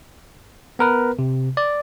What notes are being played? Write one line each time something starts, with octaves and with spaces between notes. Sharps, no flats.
B3 A#4 B4
C3
D5